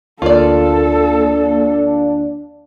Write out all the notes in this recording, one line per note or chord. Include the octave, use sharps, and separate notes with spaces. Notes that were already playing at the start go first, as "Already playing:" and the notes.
D2 A#3 D4 F4 A4 D5 F5